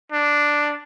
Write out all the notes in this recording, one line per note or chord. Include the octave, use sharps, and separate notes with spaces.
D4